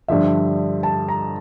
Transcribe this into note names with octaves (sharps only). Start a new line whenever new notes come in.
G2 D3 F3 E5
A5
A#5